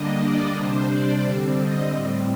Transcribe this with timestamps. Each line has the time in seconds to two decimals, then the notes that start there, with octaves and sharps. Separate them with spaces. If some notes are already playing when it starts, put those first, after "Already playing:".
Already playing: D3 G3 A#3 D4 D#5
0.23 D5
0.57 C3 G3 D4 C5
0.91 D5
1.25 D3 G3 C4
1.58 D#5
1.91 A2 G3 C4